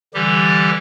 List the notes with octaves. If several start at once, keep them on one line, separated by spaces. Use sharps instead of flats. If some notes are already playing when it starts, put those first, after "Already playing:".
D3 E3 G3 G4